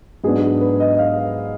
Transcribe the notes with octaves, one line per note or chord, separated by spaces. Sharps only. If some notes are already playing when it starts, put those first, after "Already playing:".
G#2 F#3 B3 D4 G#4
B4
D#5
D#5
F5